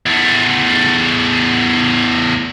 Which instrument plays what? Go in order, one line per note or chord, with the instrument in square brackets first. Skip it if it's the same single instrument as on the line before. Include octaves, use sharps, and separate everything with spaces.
[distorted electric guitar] E2 A3